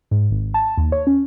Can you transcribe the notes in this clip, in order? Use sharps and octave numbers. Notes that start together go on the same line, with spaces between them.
G#2
G#1
A5
D#2
C#5
C#4